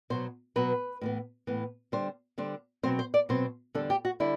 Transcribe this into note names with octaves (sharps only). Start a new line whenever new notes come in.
B2 F#3 B3 C5
B2 F#3 B3 B4
A2 E3 B3
A2 E3 B3
D3 G3 D4 C5
D3 G3 D4 C5
B2 F#3 C4 C5
C5
D5
B2 F#3 C4 C5
E2 D3 G3 D4 A4
G4
F#4
D3 G3 D4 E4